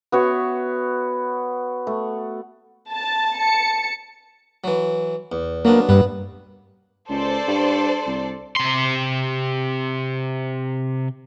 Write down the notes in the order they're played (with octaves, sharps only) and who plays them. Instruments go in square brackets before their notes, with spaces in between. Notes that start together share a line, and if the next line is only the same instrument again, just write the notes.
[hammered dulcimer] B3 F#4 C#5 E5
A3
[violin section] A5
A5 C#7
[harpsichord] E3 F#3
E2
[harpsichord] F#3 B3 D4 [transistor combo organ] A#3
[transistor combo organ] G2 [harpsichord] B3 B4
[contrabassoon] C#2 [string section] A4 C5 D5
[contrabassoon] G2
C2
[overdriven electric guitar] C3 C6